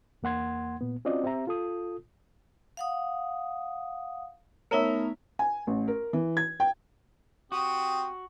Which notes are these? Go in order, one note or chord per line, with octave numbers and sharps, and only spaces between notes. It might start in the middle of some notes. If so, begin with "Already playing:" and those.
E2 A#3 F#5 C6 G#6
A#2 B3
C4 C#4 F4 F#4 D5 D#5
C4 G4 E5 A#5
F4 A4 D#6
F5 F#5 D#6
A3 B3 D#4 A#4 C#5 E5
G#5
A1
A#4
E3
G#6
G5
C4 F#4 G4 D#6